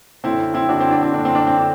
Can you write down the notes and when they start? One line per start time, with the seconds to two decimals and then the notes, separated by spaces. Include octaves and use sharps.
0.24 F#2 D3 C4 E4
0.54 C4 E4
0.69 F#2 D3 D4 F#4
0.80 C4 E4
0.91 D4
1.03 C4
1.14 F#2 D3 D4
1.25 C4
1.35 D4
1.47 C4
1.57 D3 D4